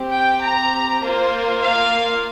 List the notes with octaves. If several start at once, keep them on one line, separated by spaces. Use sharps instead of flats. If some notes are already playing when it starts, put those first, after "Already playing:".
Already playing: C4 G4
G5
A#5
A#3 F4 C5
F5